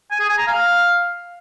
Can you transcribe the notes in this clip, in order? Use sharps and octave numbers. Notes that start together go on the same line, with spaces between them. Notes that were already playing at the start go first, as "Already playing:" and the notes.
G#5
G#4
G#5
A#5
F5